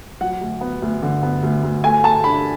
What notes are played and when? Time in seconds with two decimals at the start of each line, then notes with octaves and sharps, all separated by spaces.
0.21 F#3 F#5
0.41 D2
0.61 B3
0.82 D2
1.02 D3
1.23 B3
1.43 D2
1.63 D2
1.84 A3 G#5
2.04 A3 A5
2.24 D4 B5